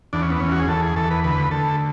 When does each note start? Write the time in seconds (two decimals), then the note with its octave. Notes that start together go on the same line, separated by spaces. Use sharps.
0.13 E2 D4
0.22 C#4
0.31 B3
0.40 E2 C#4
0.51 F#4
0.60 G#4
0.68 E2 A4
0.82 G#4
0.96 E2 A4
1.11 B4
1.24 D2 B4
1.51 D2 A4